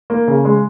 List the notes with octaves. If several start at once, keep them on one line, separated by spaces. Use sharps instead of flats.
A#3
C#3
G#3